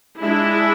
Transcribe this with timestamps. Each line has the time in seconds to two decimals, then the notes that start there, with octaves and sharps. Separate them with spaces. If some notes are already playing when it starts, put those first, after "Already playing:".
0.21 G#3 D4 E4